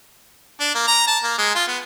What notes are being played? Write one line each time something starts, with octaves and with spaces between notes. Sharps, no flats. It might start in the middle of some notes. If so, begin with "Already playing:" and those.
D4
A#3
A#5
A5
A#3
G#3
F4
B3